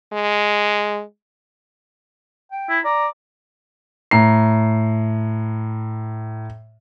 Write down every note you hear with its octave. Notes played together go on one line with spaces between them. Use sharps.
G#3
G5
E4
D5 A#5
A2 A#5 C7